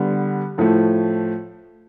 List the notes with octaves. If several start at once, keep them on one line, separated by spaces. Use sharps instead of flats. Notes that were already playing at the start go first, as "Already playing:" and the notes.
Already playing: D3 G3 B3
A2 F3 A3